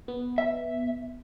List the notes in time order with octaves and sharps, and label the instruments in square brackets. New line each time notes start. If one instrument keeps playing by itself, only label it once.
[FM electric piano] B3
[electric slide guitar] E5